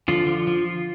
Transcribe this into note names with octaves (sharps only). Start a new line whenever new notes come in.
D3 F3 F4
F3
F3